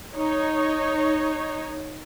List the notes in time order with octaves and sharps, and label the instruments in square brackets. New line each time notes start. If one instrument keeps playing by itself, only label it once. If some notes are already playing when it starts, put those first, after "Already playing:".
[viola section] D#4 C#5